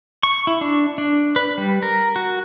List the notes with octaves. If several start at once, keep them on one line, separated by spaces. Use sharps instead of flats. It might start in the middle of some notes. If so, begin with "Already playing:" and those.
C#6
E4
D4
D4
B4
G3
A#4
F#4